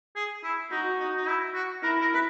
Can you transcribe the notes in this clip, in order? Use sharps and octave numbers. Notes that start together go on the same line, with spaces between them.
G#4
E4
D#4 F#4
D#4
D#4
E4
F#4
E4 A#4
A#4
B4